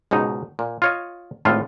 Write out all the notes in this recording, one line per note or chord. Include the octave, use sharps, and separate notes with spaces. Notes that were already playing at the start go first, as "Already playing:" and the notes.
C#2 G#2 B2 D#4
A#2
F4 C#5 D#5
G#1 A2 A3 F4